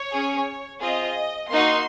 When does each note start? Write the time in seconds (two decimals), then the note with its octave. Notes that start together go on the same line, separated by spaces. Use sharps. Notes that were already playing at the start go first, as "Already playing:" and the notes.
Already playing: C#5
0.12 C#4 G#4
0.81 C4 F4 G#4 D#5
1.51 A#3 D#4 F#4 C6